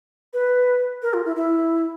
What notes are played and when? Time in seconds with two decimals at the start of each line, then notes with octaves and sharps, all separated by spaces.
0.33 B4
1.03 A#4
1.14 F4
1.25 E4
1.36 E4